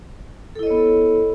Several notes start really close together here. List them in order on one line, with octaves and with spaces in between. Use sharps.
A4 E4 D#5 C#5 B3